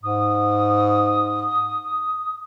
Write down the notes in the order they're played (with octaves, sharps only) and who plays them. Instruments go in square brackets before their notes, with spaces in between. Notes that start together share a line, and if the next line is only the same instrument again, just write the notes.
[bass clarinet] G#2 [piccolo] D#6